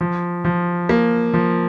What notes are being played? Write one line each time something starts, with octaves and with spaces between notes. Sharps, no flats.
F3
F3
A#3
F3